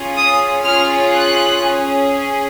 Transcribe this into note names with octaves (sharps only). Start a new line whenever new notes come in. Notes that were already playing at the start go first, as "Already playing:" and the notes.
Already playing: C#4 F4 G#4
D#6
C#4 F4 G#4 F6
F#6
C#4 G#4